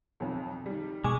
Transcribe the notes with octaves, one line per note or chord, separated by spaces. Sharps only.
B1 F2
D#3 G3
B2 G#3 G#5 C#6 D6